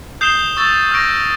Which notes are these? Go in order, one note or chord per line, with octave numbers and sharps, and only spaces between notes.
D#6 G6 C7 E7 G7
C#6 E6 A6
C#6 F6 A#6 D7